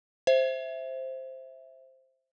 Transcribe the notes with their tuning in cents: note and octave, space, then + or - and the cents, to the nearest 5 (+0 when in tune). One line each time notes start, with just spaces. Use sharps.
C5 +5 E5 +0